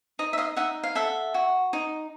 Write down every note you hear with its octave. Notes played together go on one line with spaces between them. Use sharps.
D#4 D#5
E5
D#5 F5
D#4 E5 F#5
F5
A4 E5 F#5
F#4
D#4